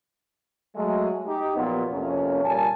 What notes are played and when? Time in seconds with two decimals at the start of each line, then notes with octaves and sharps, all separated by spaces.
0.76 F#3 G#3 A3
1.27 D#4 G4
1.57 A#2 F3 F#3 B3
1.91 F2 C3 E3 A#3 C#4
2.44 A#2 G3 A#4 G#5 A5